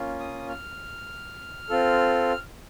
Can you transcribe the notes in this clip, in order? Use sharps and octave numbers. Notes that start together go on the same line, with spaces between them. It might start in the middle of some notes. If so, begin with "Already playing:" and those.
Already playing: A#3 C#4 F4
D#6
F6
C4 F4 A4